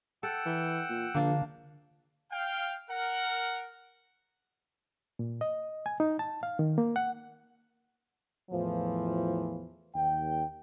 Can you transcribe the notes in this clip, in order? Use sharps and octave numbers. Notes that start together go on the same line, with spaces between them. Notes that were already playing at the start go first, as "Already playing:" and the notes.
A4 F#5 G5 E6
E3
A#2
A#1 D3 A#3 D4
F5 G5
A#4 F#5
A#2
D#5
G#5
D#4
A5
F5
D#3
A#3
F#5
E2 A2 E3 F3
D#2 G5